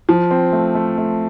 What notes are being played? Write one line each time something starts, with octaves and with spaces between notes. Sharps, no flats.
F3
C4
A3
A3
A3